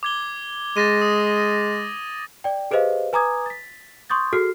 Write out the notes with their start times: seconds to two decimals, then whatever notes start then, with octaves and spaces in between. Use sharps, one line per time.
0.03 D6 G#6 G7
0.77 G#3 A6 A#6 D#7
1.02 D#6
2.44 D5 G5
2.71 G4 G#4 B4 C5 D#5 F5
3.13 B4 G#5 A#5 D6 D#6 G#6
3.46 A6 B6
4.10 C6 C#6 D#6 G6 A6
4.33 F#4 G#4 A4 F6 C7